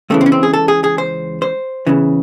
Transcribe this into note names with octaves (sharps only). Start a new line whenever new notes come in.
C#2 C#3 E3 A3
C4
C#4
C4
G#4
A4
G#4
G#4
C5
C5
E2 C#3 E3